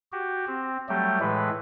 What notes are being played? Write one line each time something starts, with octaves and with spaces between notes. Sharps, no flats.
F#4 G4
C4
F#3 G3 A3 G4
A2 E3 G#3 B4